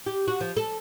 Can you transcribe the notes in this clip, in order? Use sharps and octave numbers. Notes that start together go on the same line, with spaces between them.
G4
F#4
F3
A4